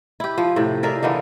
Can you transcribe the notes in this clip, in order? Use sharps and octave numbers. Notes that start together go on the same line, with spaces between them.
E4 G4
F3
A2 C3
G#4 A#4 D5 E5
D3 E3 A#3 D#4